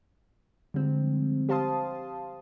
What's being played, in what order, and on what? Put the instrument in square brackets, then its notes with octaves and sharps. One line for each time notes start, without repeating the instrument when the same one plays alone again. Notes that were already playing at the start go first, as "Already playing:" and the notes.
[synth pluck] D3 F3 G3 G#3 C4
G4 C5 F5 A5 C6 D#6